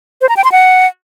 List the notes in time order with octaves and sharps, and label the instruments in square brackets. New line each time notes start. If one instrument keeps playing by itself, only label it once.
[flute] C5
A#5
G5
C6
F#5